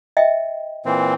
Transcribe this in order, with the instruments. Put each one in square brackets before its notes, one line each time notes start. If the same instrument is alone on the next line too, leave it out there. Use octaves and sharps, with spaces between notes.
[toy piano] D#5 E5 G5
[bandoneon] A#2 E3 C4